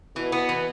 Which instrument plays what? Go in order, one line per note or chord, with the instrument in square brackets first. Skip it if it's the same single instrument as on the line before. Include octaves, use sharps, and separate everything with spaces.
[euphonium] B2 [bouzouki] E3
[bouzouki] B3
E3